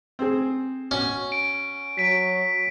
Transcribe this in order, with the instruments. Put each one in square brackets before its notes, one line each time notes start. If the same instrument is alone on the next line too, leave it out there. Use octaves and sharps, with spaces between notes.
[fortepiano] C4 G#4
[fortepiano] B2 [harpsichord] C#4
[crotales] D7
[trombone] F#3 [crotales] B6 D7